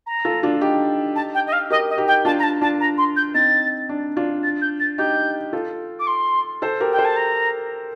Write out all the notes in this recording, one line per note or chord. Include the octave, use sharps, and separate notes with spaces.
A#5
F4 A4
D4 F4
D#4 G4
A5
G5
D#5
F5
G4 A#4 D#5
D#5
D#4 G4
G5
D4 F4 A5
A#5
A5
D4 F4 A5
A#5
C6
G6
C4 D#4 A6
D4
D4 F4
A6
G6
A6
D#4 G4 G6
F4 A4
D6
C6
A4 C5
G4 A#4
G5
A4 C5
A5
A#5